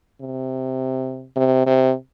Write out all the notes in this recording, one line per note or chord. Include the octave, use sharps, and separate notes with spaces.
C3
C3
C3